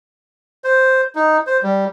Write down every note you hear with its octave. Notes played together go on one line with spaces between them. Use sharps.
C5
D#4
C5
G3